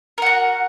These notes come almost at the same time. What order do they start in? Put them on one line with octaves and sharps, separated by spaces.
A#4 F#5 F#4